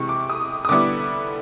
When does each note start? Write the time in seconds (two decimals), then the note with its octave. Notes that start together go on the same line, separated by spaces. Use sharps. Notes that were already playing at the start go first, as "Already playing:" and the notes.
Already playing: C3 E3 G#3 C4 C#6
0.09 D6
0.29 D#6
0.65 D#6
0.69 D3 G3 B3 E4 D6